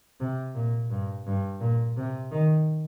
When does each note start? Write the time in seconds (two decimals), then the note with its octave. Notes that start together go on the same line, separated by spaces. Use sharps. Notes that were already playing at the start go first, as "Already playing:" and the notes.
0.20 C3
0.55 A#2
0.91 G2
1.26 G2
1.61 A#2
1.97 C3
2.31 D#3